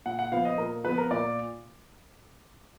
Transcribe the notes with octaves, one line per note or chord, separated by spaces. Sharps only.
A#2 F#5
F#5
F3 B3 F5
D#5
A#2 A#4
F3 B3 B4
A#4
A#2 D5